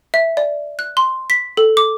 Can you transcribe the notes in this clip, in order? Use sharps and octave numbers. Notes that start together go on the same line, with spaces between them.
E5
D5
F#6
C6
B6
A4
D6